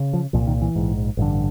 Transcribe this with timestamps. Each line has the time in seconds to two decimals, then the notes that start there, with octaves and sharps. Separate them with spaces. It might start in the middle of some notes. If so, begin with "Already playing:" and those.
Already playing: C#3
0.13 F3
0.33 C2 A#2 F3
0.47 D#3
0.62 E3
0.76 A#1 G#2
1.17 A1 G2 D3